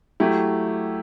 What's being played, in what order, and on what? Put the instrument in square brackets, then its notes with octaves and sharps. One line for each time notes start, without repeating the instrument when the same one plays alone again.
[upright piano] F#3 A3 E4 G4